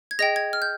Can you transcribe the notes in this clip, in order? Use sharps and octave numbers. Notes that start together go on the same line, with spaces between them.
G#6
G#4 D#5 G5 A#6
G#6
F6
G6